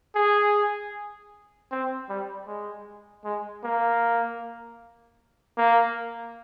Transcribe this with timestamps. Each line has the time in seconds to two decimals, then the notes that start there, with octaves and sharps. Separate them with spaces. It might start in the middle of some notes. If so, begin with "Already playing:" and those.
0.15 G#4
1.71 C4
2.09 G3
2.48 G#3
3.25 G#3
3.64 A#3
5.58 A#3